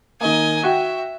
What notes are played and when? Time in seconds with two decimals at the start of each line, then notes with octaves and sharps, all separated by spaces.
0.21 D#3 A#3 D#5 G#5
0.63 F#4 E5 G5